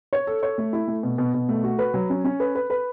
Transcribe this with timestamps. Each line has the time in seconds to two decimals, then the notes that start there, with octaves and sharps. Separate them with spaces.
0.13 C#5
0.27 A4
0.43 C#5
0.58 A3
0.73 E4
0.88 A3
1.03 B2
1.18 B2
1.34 B2
1.49 A3
1.64 F#4
1.79 B4
1.94 F#3
2.10 C#4
2.24 C#4
2.40 B4
2.55 B4
2.70 B4